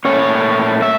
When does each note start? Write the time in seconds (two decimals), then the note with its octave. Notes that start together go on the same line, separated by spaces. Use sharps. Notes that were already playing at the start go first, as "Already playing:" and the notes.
0.05 A#2 A3 C#4 C#5
0.82 E5